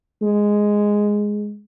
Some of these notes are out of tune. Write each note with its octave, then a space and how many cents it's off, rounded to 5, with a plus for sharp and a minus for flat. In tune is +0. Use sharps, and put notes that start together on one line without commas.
G#3 +0